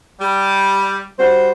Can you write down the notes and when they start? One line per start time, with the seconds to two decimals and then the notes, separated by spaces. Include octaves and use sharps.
0.20 G3
1.19 G3 F#4 C5